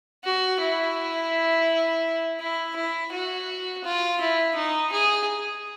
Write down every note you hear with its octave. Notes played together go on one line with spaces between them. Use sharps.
F#4
E4
E4
E4
F#4
F4
E4
D#4
G#4